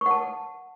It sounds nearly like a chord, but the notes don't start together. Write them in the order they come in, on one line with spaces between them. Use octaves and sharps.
C#6 F#5 A5